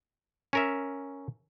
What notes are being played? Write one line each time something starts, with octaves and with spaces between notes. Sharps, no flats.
C#4 A#4 E5